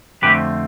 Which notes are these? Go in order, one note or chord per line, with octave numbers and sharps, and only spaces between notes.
F2 D3 A3 C4 G4 B4